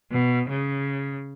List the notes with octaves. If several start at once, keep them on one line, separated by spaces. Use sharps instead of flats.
B2
C#3